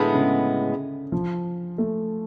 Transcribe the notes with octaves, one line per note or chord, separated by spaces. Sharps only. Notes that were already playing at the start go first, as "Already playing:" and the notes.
Already playing: A2 D3 G#3 B3
C#3
F3
A3